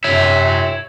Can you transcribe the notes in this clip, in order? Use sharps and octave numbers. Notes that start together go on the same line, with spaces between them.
F#2 C3 C#5 E5